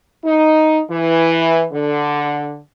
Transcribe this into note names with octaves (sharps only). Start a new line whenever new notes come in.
D#4
E3
D3